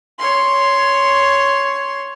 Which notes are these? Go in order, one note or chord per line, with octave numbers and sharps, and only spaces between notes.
C#5 C6